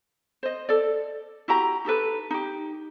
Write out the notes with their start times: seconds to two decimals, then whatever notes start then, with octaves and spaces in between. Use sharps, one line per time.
0.43 C5 D#5
0.69 A4 D5
1.48 E4 F#4 G4 A#5
1.85 D#4 G4 A4 B4
2.30 D#4 G4